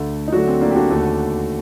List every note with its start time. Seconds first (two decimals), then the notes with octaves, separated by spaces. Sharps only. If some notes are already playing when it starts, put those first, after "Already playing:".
Already playing: D2 D3 A3
0.28 D#4
0.32 D2 D3 F#3 A3 D4 F#4
0.47 C4
0.61 A#3 D4
0.71 G4
0.76 D4 F#4
0.90 D#2 D3 A3